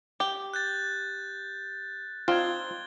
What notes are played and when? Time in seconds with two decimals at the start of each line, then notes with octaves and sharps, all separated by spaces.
0.20 G4
0.54 F#6 G6 A6
2.28 C4 D4 D#4 F4 G#6 G7